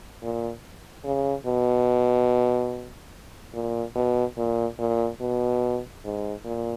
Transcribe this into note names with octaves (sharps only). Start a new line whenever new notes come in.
A#2
C#3
B2
A#2
B2
A#2
A#2
B2
G#2
A#2